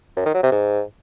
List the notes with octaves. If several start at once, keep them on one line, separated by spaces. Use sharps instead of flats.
F#2
D#3
F#3
C3
G#2